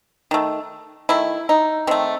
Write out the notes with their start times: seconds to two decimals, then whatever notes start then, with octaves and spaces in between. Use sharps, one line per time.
0.31 D#3 A3
1.09 D#3 A3 E4
1.49 D#4
1.87 D#3 A3 C4